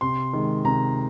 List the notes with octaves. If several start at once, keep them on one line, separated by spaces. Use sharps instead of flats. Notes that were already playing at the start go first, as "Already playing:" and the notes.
C3 C6
D#3 G#3
C3 A#5